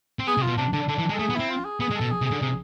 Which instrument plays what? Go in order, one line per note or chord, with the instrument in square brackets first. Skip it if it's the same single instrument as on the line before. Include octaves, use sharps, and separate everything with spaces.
[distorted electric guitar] C4
[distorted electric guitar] B3 [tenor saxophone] G#4
[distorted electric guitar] C3
[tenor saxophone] F4
[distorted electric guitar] B2
[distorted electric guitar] C3 [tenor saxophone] D4
[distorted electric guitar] D3 [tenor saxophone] D4
[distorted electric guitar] D3 [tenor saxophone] D4
[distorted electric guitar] E3
G#3
[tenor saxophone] A4
[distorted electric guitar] A3 [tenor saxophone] G#4
[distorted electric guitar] B3
[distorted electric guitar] C4 [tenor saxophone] E4
[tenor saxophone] F4
G#4
[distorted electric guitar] B3 [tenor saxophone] G#4
[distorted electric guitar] G#3
[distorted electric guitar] B2 [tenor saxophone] A4
[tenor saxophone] G#4
[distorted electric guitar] C3
[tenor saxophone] G#4
[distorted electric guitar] D3
[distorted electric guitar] C3 [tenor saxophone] G#4